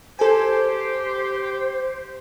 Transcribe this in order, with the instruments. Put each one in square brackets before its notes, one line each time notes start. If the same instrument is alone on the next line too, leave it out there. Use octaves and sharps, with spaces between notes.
[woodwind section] G4 [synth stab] A4 G#5 [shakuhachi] C5